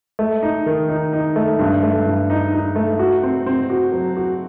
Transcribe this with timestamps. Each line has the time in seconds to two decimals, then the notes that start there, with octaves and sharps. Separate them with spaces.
0.19 A3
0.43 D#4
0.66 D#3
0.89 D#4
1.13 D#4
1.36 A3
1.59 G2
1.83 A3
2.06 G2
2.30 D#4
2.52 D#4
2.76 A3
2.99 F#4
3.23 C4
3.46 C4
3.70 F#4
3.93 F#3
4.17 F#4